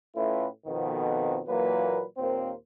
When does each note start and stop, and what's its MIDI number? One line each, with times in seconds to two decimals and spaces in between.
0.15 0.47 45
0.15 0.47 57
0.15 0.47 61
0.15 0.47 64
0.15 0.47 65
0.15 0.47 71
0.66 1.40 41
0.66 1.40 47
0.66 1.40 51
1.47 2.03 46
1.47 2.03 52
1.47 2.03 54
1.47 2.03 58
1.47 2.03 71
2.18 2.52 39
2.18 2.52 46
2.18 2.52 58
2.18 2.52 60
2.18 2.52 72